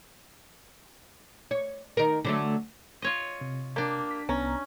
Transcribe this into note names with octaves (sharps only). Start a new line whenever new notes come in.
C#5
D#3 A#4
D3 F#3 A3
F4 C#5 D#5
C3
A#3 D4 G4
B6
C2 B3 C#4 A#5